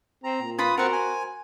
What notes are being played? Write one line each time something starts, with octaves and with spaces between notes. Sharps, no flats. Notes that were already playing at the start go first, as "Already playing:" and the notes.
C4 A#5
A#2
F4 B4 B5 D#6
C4 F#4 A#4 C5 F#5
G#5